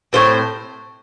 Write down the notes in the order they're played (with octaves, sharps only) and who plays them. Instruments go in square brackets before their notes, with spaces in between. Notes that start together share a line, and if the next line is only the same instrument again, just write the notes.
[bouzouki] A2 G3 C4 C5